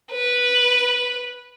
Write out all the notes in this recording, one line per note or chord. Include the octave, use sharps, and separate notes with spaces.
B4